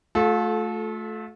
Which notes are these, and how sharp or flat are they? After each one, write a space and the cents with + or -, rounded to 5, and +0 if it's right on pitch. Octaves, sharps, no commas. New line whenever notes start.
A3 -10 F4 +35 A4 -25